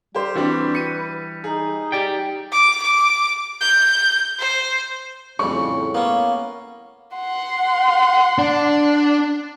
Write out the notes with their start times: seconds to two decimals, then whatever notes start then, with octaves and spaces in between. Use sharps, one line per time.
0.15 G3 G4 C5
0.36 E3 G3 C4 D4 F#4 B4
0.75 C#7 D#7
1.44 D#4 G#4
1.92 G4 D5 G5
2.52 D6
2.82 D6
3.61 G6
4.39 C5
5.39 F2 A2 C#3 G3 C#6
5.95 A#3 B3 C#4
7.16 F#5 C6
8.38 D4